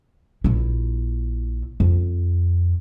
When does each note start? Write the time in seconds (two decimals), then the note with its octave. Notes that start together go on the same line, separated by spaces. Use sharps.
0.44 A#1 E4
1.80 F2